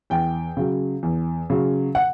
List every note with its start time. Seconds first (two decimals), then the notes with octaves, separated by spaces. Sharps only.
0.10 E2 G5
0.57 C#3 F#3
1.03 E2
1.50 C#3 F#3
1.95 F#5